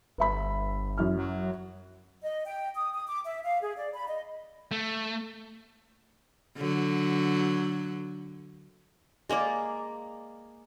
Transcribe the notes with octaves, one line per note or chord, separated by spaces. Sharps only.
G1 B4 E5 B5
F#2 E4 F6
F#3
D#5
G5
D#6
D#6
D6
E5
F5
G#4
D5
B5
D#5
A3
D3 F#3
G#3 A#3 G#4 D5